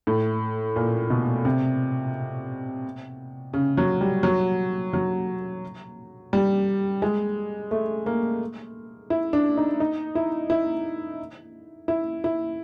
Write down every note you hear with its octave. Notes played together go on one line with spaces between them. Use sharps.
A2
A#2
B2
C3
C#3
F#3
G3
F#3
F#3
G3
G#3
A3
A#3
E4
D4
D#4
D#4
E4
E4
E4
E4